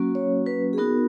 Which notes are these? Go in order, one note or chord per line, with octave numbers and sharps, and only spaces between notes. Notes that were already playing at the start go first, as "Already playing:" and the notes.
Already playing: F#3 A#3 C#4 F#4
C#5
B4
G#4
B3 D#4 F#4 A#4